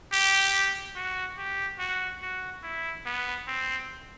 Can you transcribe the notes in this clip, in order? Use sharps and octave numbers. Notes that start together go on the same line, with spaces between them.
G4
F#4
G4
F#4
F#4
E4
B3
C4